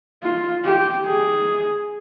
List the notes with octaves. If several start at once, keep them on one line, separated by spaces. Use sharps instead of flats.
F4
G4
G#4